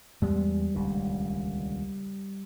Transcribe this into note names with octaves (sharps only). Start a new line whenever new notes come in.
E2 G3 G#3 B3
D#1 C#2 D3